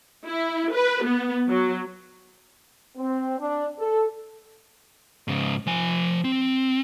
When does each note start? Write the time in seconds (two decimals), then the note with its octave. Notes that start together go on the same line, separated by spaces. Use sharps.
0.25 E4
0.72 B4
1.04 B3
1.48 F#3
2.97 C4
3.38 D4
3.79 A4
5.28 G#2 C#3
5.67 F3 G#5
6.24 C4